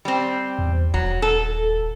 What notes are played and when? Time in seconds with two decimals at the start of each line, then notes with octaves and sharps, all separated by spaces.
0.05 G3 C4
0.59 E2
0.94 D#1 F#3
1.22 A4